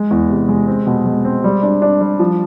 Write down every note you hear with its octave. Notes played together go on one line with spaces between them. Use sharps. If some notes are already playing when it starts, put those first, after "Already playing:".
Already playing: G#3
E2
C3
G#3
C4
B2
G#3
C4
G3
D4
D4
G3
F3